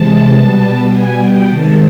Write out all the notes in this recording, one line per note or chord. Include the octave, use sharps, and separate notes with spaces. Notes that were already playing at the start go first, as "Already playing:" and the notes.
Already playing: C3 E3 G#3 A5
B2 G3 B3
G#5
G5
C3 D#3 G#3 A5